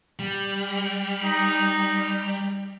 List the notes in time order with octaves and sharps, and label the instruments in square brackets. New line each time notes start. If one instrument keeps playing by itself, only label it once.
[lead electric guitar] G3
[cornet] D#4